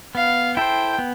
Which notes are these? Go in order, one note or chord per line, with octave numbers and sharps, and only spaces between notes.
B3 F5
E4 A4 C5 G5
B3